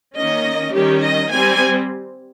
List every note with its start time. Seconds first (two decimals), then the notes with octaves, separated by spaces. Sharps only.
0.16 D#3 A#3 C#4 D#5
0.73 D#3 G3 C#4 G4
1.02 D#5
1.30 G3 C4 G#5